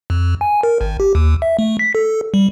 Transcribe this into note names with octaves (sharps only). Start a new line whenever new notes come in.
F2
G#5
A#4
G#1
G4
D#2
E5
A3
B6
A4
G3